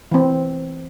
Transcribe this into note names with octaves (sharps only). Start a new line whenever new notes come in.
E3 C4